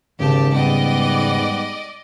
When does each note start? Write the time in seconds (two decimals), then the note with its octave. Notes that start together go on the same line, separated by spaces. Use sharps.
0.19 G#1 E2 C#3 G4 A5
0.53 G#2 G3 B3 D5 D#5